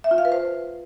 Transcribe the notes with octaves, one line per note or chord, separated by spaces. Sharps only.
E5
F4
F5
B4
C5